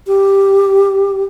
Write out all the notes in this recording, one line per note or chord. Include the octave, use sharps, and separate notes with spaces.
G4